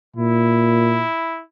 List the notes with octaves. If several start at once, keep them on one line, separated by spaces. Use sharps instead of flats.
A#2 E4